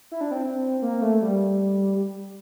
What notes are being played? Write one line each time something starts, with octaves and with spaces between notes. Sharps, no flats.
E4
D4
C4
A#3
A3
G3